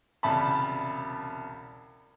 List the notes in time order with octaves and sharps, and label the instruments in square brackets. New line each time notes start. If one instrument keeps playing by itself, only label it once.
[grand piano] E1 C2 C#3 E5 A5 B5